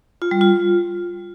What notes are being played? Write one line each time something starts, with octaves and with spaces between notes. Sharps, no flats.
F4
G3
F4